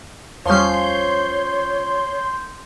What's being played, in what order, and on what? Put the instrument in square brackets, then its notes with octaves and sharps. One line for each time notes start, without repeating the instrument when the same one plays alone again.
[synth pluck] E2 G3 [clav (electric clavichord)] F3 C#4 [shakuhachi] C#5 [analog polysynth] C6 G6